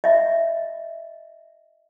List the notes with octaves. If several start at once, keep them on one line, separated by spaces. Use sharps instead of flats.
D#5 E5